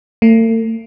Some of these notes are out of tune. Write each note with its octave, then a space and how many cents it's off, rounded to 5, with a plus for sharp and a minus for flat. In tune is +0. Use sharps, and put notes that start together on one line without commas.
A3 +45